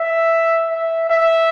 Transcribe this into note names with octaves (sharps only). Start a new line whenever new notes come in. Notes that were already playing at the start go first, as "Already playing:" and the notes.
Already playing: E5
E5
E5